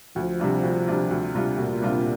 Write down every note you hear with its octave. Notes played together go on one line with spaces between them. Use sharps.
D2 F3
C3 G3 D4 F4
D2
C3 G3 D4 F4
D2
C3 G3 D4 F4
D2 A#2
C3 G3 D4 F4